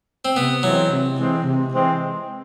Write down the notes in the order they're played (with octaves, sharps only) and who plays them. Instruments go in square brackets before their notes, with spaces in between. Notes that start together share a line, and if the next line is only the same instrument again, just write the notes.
[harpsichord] C4
[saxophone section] C3 [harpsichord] B3
[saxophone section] E3 G#3 C4 [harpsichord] F#3
[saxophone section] C3
E3 G#3 C4
C3
E3 G#3 C4